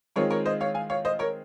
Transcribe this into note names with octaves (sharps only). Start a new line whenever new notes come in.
D#3 G#3 C4 F4 A#4 C#5
A#4 C#5
C5 D#5
C#5 F5
F5 G#5
C#5 F5
C5 D#5
A#4 C#5